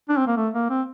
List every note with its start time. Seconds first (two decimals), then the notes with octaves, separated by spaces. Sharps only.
0.09 D4
0.17 C4
0.27 A#3
0.37 A3
0.54 A#3
0.70 C4